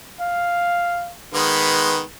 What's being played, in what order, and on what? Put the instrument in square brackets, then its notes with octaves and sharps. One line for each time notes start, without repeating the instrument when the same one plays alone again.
[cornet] F5
[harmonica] D#3 G#3 B3 [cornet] B4